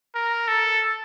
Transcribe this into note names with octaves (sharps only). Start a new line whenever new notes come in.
A#4
A4